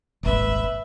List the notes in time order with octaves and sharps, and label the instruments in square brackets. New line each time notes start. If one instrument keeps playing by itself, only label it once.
[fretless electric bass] D#1 G#1 [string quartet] B4 E5